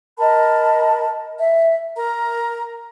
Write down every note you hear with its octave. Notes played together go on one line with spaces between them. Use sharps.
A#4 D#5 A5 B5
E5
A#4 A#5